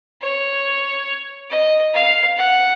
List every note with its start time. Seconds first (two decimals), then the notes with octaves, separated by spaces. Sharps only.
0.21 C#5
1.50 D#5
1.93 F5
2.37 F#5